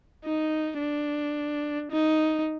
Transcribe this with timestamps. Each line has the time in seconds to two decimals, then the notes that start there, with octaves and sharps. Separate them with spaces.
0.25 D#4
0.79 D4
1.91 D#4